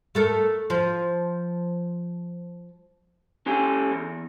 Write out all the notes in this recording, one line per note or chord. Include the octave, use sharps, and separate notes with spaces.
A3 A4 A#4
F3
C#4 G4 A4 G#5
E2